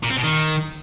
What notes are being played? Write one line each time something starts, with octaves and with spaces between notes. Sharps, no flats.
A#2
C4
B2
D#3